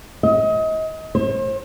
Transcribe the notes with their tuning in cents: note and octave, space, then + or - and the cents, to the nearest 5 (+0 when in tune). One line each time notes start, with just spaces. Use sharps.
D#5 +30
C5 +45